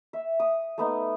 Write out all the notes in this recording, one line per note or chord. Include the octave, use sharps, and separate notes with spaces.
E5
D#6
A3 B3 D#4